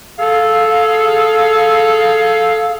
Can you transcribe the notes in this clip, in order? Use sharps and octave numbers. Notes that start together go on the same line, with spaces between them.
G#4 A4 F5